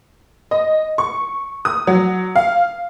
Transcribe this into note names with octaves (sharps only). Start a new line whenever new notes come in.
D#5
C#6
D#6
F#3
F5